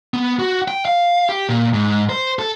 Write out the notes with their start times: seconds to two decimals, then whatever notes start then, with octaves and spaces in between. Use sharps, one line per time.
0.14 B3
0.39 F#4
0.68 G5
0.85 F5
1.29 G4
1.49 A#2
1.74 G#2
2.09 C5
2.39 A4